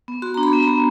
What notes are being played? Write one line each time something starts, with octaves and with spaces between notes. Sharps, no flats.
B3
F#4 C6
D4 A#5
B5
B3
A#5
B3